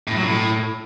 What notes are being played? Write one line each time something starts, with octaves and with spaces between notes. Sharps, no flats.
A2
F#3
A2